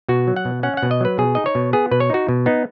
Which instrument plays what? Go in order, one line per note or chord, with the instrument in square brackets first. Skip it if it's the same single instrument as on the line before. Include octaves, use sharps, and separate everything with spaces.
[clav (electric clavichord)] B2 F#4
F#3
F#5
B2
C#4 F#5
F#5
B2
D#5
F#3 B4
B2 G#4
D#4 D#5
C#5
B2
B3 G#4
B2 B4
C#5
D#4 F#4
B2
B3 D#4